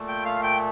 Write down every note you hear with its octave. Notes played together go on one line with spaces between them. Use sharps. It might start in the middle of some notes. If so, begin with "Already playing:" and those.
Already playing: A#2 A3
G5
F5
G5